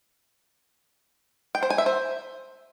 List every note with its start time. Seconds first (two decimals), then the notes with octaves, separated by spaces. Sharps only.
1.55 G5
1.63 C5
1.70 G#5
1.78 E5
1.86 C5